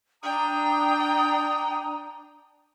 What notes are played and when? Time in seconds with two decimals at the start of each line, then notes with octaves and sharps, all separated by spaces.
0.23 D4 G5 A#5 D#6